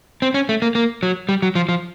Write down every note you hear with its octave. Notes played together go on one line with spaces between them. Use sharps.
C4
C#4
A3
A#3
A#3
F#3
G3
F#3
F3
F3